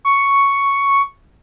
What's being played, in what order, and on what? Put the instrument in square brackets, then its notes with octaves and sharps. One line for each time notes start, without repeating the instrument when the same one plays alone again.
[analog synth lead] C#6